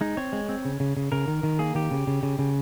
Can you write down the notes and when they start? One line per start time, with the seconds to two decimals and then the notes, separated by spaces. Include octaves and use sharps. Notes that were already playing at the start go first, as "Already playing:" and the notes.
0.01 G#3 D#4
0.17 C4 C#5
0.33 G#3
0.49 C4
0.65 C#3
0.80 C#3
0.97 C#3
1.12 C#3 A#4
1.28 D#3
1.43 D#3
1.59 A#3 G#4
1.75 D#3 G4
1.91 C#3
2.07 C#3
2.23 C#3
2.39 C#3